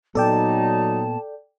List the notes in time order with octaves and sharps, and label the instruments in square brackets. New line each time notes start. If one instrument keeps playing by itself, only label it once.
[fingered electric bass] A#2 B3 [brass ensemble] F#3 D#4 [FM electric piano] A4 D5 G5 [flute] A5